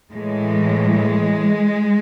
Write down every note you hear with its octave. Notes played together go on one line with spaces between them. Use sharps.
A2 E3 G#3